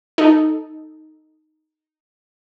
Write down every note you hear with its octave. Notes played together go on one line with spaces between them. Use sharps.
D#4 A4